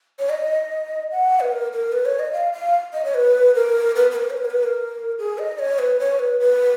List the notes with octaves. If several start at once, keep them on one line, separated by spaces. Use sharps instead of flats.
C#5
D#5
F#5
B4
A#4
A#4
B4
C#5
D#5
F5
F5
D#5
C#5
B4
A#4
B4
B4
A#4
C#5
B4
A#4
B4
A#4
G#4
D#5
C#5
B4
C#5
B4
B4